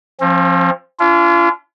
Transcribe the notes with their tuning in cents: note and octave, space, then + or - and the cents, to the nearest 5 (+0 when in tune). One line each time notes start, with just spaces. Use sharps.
F3 +0 C4 +45
C#4 +45 F4 -35